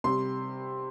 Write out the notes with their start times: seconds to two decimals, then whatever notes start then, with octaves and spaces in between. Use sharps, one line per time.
0.04 C3 G3 C6